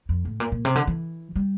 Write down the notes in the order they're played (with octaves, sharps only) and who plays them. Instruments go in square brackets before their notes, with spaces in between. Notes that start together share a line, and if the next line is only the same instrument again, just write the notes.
[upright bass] F2
A2
A#2
A#2
C3
D3
E3
G3